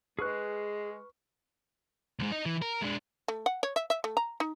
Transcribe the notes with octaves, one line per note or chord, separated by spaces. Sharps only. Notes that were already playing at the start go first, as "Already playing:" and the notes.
G#3 G#4 B4 C#6 F6 F#6
D2 G#2
D#4 D#5
E3
A#4
G#3 D4
A3
F#5
C#5
E5
E5
A3
A#5
D#4